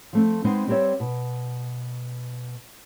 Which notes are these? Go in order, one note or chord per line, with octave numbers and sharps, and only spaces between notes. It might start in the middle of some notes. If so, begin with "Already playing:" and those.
F3 A3 C4
G#3 B3 C4 D#4 C5
G3 C4 G4 A#4 C#5 E5
B2